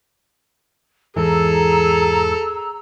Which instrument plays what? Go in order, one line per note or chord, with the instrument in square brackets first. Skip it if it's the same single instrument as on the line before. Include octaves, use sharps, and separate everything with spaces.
[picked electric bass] E2 G#2 E3 [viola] G#4 [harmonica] A4 [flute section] A#5 E6